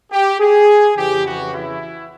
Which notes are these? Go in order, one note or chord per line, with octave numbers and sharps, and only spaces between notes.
G4
G#4
F2 C#3 E3 G4
F#4
E4